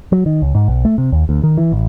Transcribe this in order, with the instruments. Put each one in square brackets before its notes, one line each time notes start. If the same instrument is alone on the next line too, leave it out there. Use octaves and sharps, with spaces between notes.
[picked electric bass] F#3
D#3
C#2
G#2
B1
A3
C3
D#2
D2
D#3
E3
A1